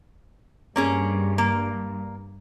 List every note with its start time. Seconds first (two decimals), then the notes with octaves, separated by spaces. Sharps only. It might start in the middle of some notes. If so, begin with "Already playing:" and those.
0.76 G2 A#3 C#4 G#4
1.38 A#3